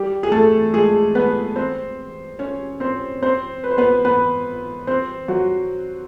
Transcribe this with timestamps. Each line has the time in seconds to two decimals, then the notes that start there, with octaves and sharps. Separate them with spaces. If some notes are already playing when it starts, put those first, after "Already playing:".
Already playing: G3 G4
0.23 G#4
0.32 A3 A4
0.74 G#3 G#4
1.15 B3 B4
1.56 C4 C5
2.39 C#4 C#5
2.80 C4 C5
3.22 C4 C5
3.64 B4
3.71 C5
3.78 B3 B4
4.05 B3 B4
4.87 C4 C5
5.28 F#3 F#4